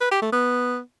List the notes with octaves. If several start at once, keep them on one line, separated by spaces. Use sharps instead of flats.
B4
G4
A3
B3